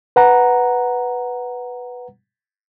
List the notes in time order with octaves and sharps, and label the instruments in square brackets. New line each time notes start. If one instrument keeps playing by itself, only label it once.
[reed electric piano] B4 F#5 A#5